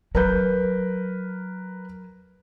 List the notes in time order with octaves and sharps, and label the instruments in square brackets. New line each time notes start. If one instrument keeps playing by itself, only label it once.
[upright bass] F#3 [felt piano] A#4 B4 G6